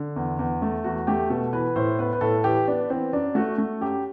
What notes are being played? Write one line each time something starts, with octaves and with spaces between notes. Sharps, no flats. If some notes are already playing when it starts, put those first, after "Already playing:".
Already playing: D3
E2
E2
A3
E2 F#4
A3 G4
B2 A4
E3 B4
A2 C5
B3 B4
B4
A2 A4
E3 G4
B3 D4
E3 C4
F#2 D4
A3 F#4
A3
F#2 G4